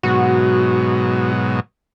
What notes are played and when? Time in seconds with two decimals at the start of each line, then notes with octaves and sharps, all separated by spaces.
0.03 G#2 B2 F#3 F#4